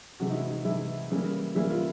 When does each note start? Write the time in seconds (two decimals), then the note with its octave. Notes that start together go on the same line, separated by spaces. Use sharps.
0.20 C3 E3 G#3 F#4
0.30 D#4
0.35 E4
0.50 D#4
0.65 C3 E3 G#3 E4
1.10 C#3 E3 G3 A#3
1.55 C#3 E3 G3 A#3 E4
1.70 F4